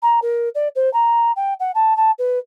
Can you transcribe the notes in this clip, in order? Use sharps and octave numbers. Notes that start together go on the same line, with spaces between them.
A#5
A#4
D5
C5
A#5
G5
F#5
A5
A5
B4